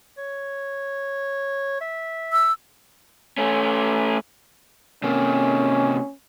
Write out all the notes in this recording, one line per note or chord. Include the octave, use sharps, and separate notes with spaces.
C#5
E5
E6
A3 C#4
C3 A#3 C#4